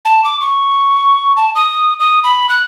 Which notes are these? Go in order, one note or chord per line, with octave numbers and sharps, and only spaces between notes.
A5
D6
C#6
A5
D#6
D#6
B5
F#6